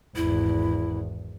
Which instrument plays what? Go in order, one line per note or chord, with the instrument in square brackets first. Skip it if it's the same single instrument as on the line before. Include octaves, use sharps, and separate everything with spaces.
[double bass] G#1 E2 [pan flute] E4